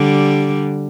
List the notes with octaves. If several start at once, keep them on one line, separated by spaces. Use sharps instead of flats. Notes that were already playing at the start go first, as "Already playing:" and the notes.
Already playing: D3 G3